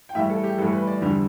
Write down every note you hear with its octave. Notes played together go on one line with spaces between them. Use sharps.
G5
A2 E3 G3 E5
A4
G4
A2 E3 G3 A4
B4
D5
E2 D3 G3